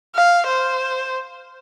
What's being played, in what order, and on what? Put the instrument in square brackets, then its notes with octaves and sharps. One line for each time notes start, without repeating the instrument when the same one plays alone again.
[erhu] F5
C5